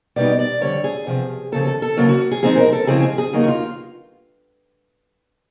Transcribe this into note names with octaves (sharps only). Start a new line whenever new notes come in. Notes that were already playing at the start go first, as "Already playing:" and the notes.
B2 G3 B3 D#4 D5
D5
F2 D3 G3 C#5
G#4
E2 C3 F3
D#2 C#3 F3 A4
A4
A4
D2 C#3 F#3 A#3 F4
F#4
G#4
A#2 F3 G#3 C4 D#4 G#4
A#4
A4
C#3 F3 G#3 C4 E4 G#4
G#4
G#4
E2 C#3 F#3 A#3 D#4
F#4
F4